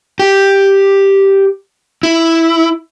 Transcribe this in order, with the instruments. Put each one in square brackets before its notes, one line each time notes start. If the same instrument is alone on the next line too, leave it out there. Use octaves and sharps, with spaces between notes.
[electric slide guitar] G4
E4